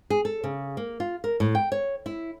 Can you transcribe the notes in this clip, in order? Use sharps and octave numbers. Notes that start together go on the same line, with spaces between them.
G#4
A4
C#3
A#3
F4
A#4
A2
G5
C#5
E4